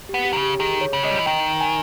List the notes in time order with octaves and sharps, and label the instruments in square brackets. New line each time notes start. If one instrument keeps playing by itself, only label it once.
[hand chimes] G4
[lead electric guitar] B3
[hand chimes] G4
[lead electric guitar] D#3
C#3
[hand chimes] G4
[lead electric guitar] D#3 [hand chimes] G#4
[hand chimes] C#5
[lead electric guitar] C#3
[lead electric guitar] G#3 [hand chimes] D#5
[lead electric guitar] G3
E3
[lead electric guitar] D#3 [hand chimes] G5
[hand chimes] G#5